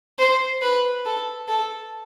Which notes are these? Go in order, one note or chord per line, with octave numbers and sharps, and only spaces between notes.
C5
B4
A4
A4